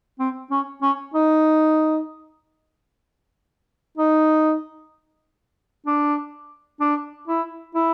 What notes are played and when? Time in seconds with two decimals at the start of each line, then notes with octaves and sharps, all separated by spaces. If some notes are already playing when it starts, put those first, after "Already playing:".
0.20 C4
0.51 C#4
0.82 C#4
1.14 D#4
3.98 D#4
5.86 D4
6.81 D4
7.28 E4
7.75 E4